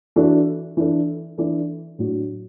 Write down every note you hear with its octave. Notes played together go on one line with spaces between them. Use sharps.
E3 D4 F#4 A4
E3 D4 A4
E3 D4 A4 D5
A2 F#3 D4 F#4